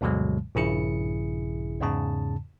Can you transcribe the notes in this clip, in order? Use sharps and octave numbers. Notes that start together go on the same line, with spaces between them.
D2 G2 B2 D3 F#3 G#3
A#1 G2 C#3 E4 G#4 C#7
E2 G#2 C#3 A5